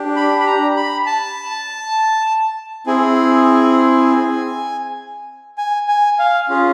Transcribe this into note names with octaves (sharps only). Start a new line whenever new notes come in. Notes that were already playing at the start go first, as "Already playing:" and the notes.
Already playing: D4 G4
B5
B5
A#5
B5
A5
C4 E4 G#4 G#5
G#5
G#5
F5
C#4 F4 G#4